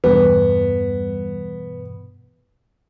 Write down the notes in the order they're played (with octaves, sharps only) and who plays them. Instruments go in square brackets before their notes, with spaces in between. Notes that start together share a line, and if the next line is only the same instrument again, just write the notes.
[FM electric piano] E2 G2 B2 [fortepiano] B3